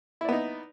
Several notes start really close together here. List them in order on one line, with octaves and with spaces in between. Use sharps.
E4 D5 B3 D#4